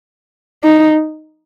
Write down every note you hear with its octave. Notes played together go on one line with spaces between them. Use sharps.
D#4